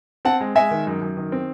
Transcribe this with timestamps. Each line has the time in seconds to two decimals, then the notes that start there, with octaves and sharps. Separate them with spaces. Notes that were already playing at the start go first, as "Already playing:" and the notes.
0.25 C4 F#5 A5
0.41 G#3
0.55 G#3 E5 G#5
0.71 D#3
0.87 F#2
1.01 F#2
1.17 D#3
1.32 C4